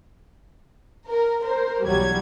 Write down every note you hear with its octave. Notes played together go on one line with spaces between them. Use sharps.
A#4
A#4 C5
B1 E2 F#3 G3 G#6